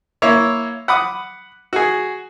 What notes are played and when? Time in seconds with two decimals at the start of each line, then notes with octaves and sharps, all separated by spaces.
0.22 A#3 E4 C#5
0.88 F#5 B5 D6 D#6
1.73 F#4 G#4